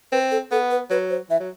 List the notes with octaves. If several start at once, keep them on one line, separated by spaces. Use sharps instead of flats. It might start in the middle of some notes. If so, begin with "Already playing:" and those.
C4 B4
A4
B3 A4
B4
F#3 B4
C5
E3 E5
F#3